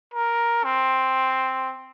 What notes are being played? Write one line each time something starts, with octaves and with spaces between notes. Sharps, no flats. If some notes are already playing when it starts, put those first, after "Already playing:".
A#4
C4